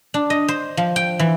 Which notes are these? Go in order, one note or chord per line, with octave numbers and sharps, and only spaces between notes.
D4
D#5
C5
F3
G5
E3